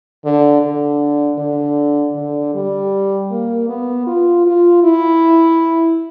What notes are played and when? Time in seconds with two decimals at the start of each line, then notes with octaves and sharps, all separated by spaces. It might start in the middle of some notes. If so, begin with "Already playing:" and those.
0.25 D3
0.62 D3
1.38 D3
2.15 D3
2.54 G3
3.31 A#3
3.68 B3
4.06 F4
4.46 F4
4.83 E4